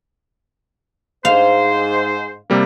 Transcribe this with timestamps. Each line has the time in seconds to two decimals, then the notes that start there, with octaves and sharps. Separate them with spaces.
1.25 G#2 C5 F5
2.50 C3 G3 A#3